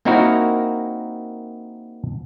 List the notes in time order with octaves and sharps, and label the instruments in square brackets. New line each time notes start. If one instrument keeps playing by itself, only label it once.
[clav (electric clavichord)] A#3 C4 D#4 E4 F#4 A#4